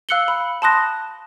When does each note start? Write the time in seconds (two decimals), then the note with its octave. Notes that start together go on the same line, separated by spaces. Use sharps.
0.09 F5 E6 F#6 C#7 F#7 G7
0.28 B5
0.62 A5 B5 C6 D#6 F#6 A#6